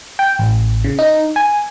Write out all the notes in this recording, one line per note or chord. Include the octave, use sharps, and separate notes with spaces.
G5
A1
C#3
D#4
G#5